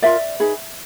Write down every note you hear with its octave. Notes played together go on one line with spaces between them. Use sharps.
F4 A#4 D5 E5
D#4 G#4 B4